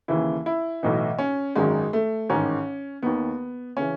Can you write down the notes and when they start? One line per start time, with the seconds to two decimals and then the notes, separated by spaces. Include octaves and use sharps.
0.08 D#2 C#3 E3 E4
0.46 E4
0.83 B1 A2 E3 D#4
1.19 C#4
1.55 G#1 F#2 D#3 G#3
1.93 A3
2.29 A1 G#2 D#3 C#4
3.02 D#2 D#3 B3
3.77 C#3 E3 C#4